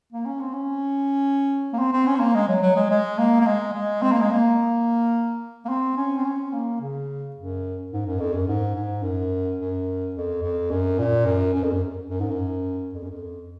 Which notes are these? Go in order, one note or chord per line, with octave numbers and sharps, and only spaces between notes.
A#3
C#4
C4
C#4
A#3
C4
C4
C#4
C4
A#3
G#3
F#3
F#3
G#3
G#3
A#3
A#3
G#3
G#3
C4
A#3
G#3
A#3
A#3
C4
C#4
C4
C#4
A#3
C#3
F#2
G#2
F#2
F2
F#2
G#2
G#2
F#2
F#2
F2
F2
F#2
A#2
F#2
F#2
F2
F#2
F#2
G#2
F#2
F2
F#2
F2